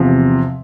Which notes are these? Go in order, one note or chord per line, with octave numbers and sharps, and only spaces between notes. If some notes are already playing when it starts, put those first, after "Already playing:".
Already playing: E2 C3 F3